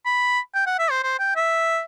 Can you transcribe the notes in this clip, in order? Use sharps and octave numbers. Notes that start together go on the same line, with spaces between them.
B5
G5
F#5
E5
C5
C5
G5
E5